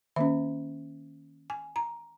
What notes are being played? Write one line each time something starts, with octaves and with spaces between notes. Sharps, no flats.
D#3 A#3 C#4 E5
G#5
A#5